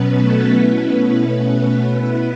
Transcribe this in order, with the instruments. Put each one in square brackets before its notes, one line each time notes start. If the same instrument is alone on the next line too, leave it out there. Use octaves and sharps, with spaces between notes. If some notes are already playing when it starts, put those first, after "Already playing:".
Already playing: [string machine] B2 F#3 B3 C#4 B4
A3 A4
B2 A3 B3 C#4 E4 B4
B2 A3 B3 C#4 B4
B3 B4
B2 B3 E4